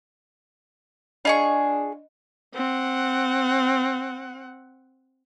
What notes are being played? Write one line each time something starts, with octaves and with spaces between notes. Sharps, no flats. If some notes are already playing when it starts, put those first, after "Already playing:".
D4 F4 G#4 D#5 B5 C#6
C4 F#5